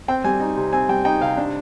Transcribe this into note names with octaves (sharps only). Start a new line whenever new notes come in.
C4 G5
G3 G#5
D#4
C3
C4 G#5
G3 G5
D#4 G5
C3 F5
D4